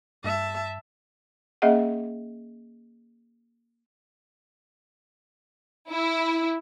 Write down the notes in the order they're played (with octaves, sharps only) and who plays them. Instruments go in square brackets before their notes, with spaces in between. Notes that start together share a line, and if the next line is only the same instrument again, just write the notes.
[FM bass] G2 [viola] E5 A5
[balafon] A#3 C#4 G#4 D#5 E5 F#5
[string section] E4